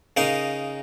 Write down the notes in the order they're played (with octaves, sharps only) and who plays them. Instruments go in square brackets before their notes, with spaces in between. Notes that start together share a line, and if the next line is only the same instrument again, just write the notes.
[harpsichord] C#3 D#4 A#4 F5